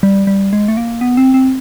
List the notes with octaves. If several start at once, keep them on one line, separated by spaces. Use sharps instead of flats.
G3
G3
G#3
A3
A#3
B3
C4
C4